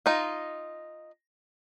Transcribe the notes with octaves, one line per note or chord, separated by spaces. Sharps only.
D#4 F4